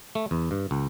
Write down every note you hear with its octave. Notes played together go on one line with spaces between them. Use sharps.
A3
E2
G2
C#2